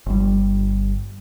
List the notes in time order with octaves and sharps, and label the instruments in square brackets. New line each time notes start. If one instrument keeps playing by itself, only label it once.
[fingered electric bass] G1 G3